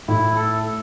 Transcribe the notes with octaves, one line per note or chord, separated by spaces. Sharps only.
A2 E4
A4